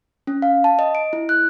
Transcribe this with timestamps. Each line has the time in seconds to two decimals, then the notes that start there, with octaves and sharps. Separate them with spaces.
0.27 C#4
0.42 F5
0.64 A5
0.79 D#5
0.95 D7
1.13 E4
1.29 F#6